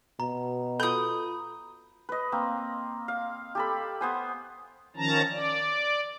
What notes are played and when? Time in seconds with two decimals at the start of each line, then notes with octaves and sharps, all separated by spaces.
0.20 B2 A#5
0.80 F4 A4 B5 D#6 G6
2.09 B4 D#5
2.32 A#3 C4
3.08 F5
3.55 G4 A4 B5
4.01 B3 C5 G#5
4.96 D#3 F3 C#4 A5 A#5
5.31 D5